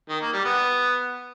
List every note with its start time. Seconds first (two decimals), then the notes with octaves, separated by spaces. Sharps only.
0.09 D#3
0.21 A#3
0.33 G3
0.45 B3